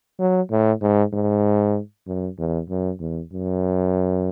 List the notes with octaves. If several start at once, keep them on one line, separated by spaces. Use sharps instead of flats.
F#3
A2
G#2
G#2
F#2
E2
F#2
E2
F#2